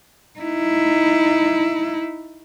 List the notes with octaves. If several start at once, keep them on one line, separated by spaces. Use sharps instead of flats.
D#4 E4